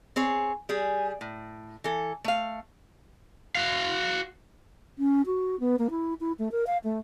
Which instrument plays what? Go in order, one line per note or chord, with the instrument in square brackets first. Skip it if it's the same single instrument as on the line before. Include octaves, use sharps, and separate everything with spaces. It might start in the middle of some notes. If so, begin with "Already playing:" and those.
[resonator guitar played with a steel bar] C4 G#4 C#5
G3 G#4
A2
E3 A4
A3 F5
[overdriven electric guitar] F#4 F5
[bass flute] C#4
F#4
B3
A#3
E4
E4
A3
A#4
F5
A3